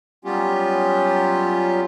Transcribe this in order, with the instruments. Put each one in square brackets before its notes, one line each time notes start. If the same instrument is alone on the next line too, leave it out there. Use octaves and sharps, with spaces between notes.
[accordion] F#3 G3 B3 C#4 F4 G4